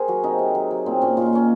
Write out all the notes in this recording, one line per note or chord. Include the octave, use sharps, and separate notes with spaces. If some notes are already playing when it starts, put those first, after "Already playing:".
Already playing: G#4 A#4 C5
F#3 F#4
C3 D#4
C3
F#3
F#3
A#2 C4
A#2 C#4
A#2 F4
D#4
A#2 C#4